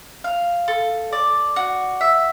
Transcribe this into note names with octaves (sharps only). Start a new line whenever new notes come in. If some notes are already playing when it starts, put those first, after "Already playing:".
F5
A4
D5
F#4
E5